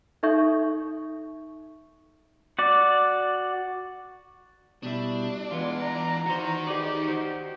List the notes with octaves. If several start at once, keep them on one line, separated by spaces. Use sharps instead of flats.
D#4 A4 E5 C#6 G6
F#4 D5
B2 G3 D4 E4
E3 G#3 B3 F4
A#5
D#3 F#4 C5
D#4 G4 G#4 B4 D5
F#4 C5